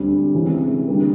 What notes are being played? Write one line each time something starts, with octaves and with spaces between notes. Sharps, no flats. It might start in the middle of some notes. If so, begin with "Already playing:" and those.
Already playing: D2 D3 G3 C4
C3 E3 G#3 C#4
D3 G3 A#3